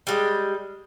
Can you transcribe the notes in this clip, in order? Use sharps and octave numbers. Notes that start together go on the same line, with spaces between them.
G3 G#3